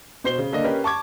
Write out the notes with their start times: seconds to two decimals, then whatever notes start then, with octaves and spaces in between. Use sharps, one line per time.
0.24 B2 C5 C7 G7
0.38 C#3
0.52 D3 A#3 D#5
0.64 C#4 G4 A#4 B4
0.84 A5 C#6 D6 G#6